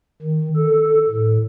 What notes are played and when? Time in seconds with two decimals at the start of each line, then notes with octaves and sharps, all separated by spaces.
0.22 D#3
0.56 A4
1.09 A2